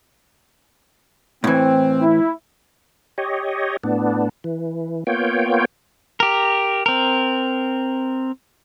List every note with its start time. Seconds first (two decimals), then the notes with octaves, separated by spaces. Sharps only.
1.44 A2 E3 C4
2.00 E4
3.18 G4 C#5 D#5
3.84 A2 B3 D4
4.44 E3
5.07 A#3 B3 F4 C#5 G5
6.20 G4 A#4
6.86 C4 A#4